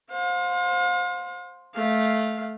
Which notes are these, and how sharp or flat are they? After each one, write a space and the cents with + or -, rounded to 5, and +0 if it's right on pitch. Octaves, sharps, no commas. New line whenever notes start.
C5 +5 F5 +40
A3 -15 F5 -5